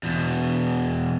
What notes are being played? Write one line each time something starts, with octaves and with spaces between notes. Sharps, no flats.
E2 B2